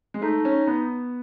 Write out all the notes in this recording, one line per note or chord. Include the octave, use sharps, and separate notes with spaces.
G#3
A3 D#4
C#4
B3